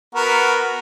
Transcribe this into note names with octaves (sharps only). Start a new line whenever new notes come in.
B3 F#4 A#4